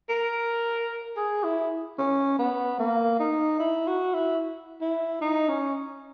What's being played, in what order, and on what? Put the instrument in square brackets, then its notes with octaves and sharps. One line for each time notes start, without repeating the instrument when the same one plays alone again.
[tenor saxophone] A#4
G#4
E4
C#4
B3
A#3
D#4
E4
F#4
E4
E4
D#4
C#4